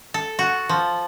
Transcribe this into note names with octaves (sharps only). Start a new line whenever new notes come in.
A4
F#4
F3